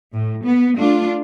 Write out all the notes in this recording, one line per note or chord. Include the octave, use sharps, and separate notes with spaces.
A2
B3
A3 D4 F4